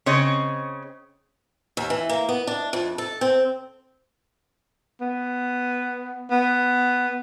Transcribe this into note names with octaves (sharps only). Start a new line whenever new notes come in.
C#3 C4 C#5 D#5
D#2
E3
A#3
B3
D4
F2
A4
C4
B3
B3